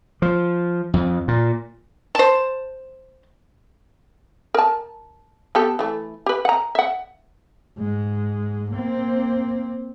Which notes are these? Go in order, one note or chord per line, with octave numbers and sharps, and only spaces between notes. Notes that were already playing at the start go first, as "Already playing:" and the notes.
F3
F2
A#2
C5 A5
A#4 A5
B3 G4 A4
E3 A3
G4 B4
F#5 A#5
E5 F#5
G#2 G#3
A#3 C4